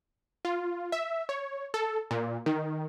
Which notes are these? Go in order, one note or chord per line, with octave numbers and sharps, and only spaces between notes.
F4
E5
C#5
A4
A#2
D#3